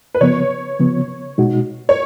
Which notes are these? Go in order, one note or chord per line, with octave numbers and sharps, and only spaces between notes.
B4
C#3 F3 B3 C#5
C#3 F3 B3
B2 G#3 D#4 F#4
C#5